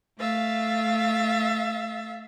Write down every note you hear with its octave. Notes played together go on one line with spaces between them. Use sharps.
A3 E5 F5 A6